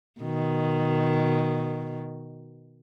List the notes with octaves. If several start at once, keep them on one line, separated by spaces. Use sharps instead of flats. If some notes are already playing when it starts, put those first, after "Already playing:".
B2 D#3